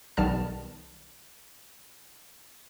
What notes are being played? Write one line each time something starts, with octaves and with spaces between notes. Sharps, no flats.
B1 D#3 G3 B3 A5 F6